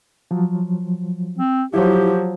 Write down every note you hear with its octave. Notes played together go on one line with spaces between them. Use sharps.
F3 F#3
C4
F3 F#3 E4 G4